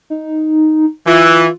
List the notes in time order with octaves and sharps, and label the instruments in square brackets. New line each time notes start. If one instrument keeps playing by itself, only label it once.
[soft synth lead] D#4
[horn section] E3 [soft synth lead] F4